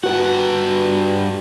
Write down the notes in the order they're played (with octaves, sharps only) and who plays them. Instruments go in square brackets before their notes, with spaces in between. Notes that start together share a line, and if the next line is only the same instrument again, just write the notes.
[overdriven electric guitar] G2 F#5 [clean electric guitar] F#4 B4 G5